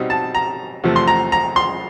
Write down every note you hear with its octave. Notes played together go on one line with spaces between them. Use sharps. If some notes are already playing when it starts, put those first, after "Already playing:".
Already playing: B2 G3 C4 D#4
A5
A#5
E2 C3 F3 A3
C6
A#5
A#5
C6